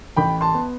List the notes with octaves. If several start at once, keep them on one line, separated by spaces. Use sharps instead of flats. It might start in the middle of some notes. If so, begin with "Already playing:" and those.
A1 G5 B5
A5 C6
B3